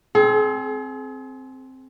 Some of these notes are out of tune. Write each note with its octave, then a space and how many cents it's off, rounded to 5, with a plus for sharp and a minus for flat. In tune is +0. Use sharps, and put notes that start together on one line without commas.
C4 +0 G#4 +40